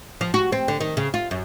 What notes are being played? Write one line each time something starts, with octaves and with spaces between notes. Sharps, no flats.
F3
F#4
C4
D3
D#3
C#3
F4
F#2